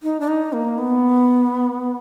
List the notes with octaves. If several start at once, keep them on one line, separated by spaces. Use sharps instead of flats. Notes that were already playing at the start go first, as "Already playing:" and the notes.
D#4
D4
D#4
A#3
B3